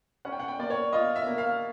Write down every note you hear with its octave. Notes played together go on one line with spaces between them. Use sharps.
C#4 F#5
G5
F#5
G5
A#3 D5
C#5
F4 D#5
E5
A#3
F5